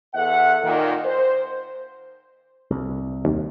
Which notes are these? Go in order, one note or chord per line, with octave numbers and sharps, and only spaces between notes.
E2 A4 E5 F#5
A#2 D#3
C5
C2
D#2